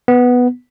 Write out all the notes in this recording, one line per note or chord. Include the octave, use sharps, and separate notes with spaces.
B3